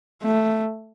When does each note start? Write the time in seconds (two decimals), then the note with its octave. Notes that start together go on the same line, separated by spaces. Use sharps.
0.22 A3